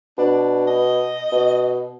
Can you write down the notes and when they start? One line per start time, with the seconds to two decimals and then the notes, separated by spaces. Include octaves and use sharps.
0.18 B2 D4
0.67 D#5
1.32 B2